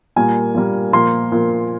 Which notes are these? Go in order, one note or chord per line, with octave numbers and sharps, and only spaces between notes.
A#2 G3 A#3 G#5
A#2 G3 A#3
A#2 F3 A#3 C6
A#2 F3 A#3